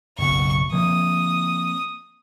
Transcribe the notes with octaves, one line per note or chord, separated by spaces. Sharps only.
F#1 B1 B2 C#6
F3 A#3 C4 D#6